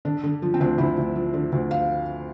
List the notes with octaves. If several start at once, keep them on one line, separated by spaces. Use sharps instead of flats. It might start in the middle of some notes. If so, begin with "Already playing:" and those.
D3 D4
D3
F3
C4
D2 D4
D2 E4
D2
F3
D3
D2
F5